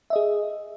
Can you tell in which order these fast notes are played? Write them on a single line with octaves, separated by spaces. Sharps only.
E5 D#5 G#4